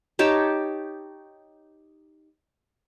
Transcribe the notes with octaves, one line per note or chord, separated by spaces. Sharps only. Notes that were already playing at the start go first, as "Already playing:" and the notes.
D#4 G4 C#5 A5